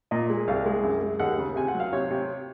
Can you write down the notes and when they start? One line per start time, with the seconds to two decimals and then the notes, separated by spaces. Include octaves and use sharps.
0.11 A#2 D#5
0.30 G#3
0.48 C2 F5
0.66 G#3
0.83 F#2
1.01 G#3
1.19 D#2 F#5
1.38 C#3
1.56 C3 G#5
1.68 F#5
1.74 F#3
1.80 F5
1.93 C3 C#5
2.11 C3